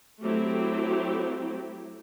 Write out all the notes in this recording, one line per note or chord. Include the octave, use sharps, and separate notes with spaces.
F#3 A3 C4 E4 G4